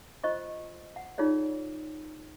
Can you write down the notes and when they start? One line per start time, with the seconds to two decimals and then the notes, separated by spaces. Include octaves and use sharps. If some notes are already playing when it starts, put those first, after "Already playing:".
0.24 F4 C5 D#5 C#6
0.96 F#5
1.18 D#4 F4 G#4 C#5 D5